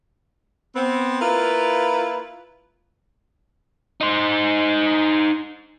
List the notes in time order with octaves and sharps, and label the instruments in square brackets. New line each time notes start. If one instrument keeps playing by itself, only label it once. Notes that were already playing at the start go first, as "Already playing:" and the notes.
[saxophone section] B3 C4
A#3 E4 F4 B4
[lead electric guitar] D#4 C5